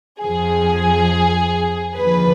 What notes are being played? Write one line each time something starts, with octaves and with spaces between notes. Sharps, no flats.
F2 F3 G#4
D#2 D3 F3 B4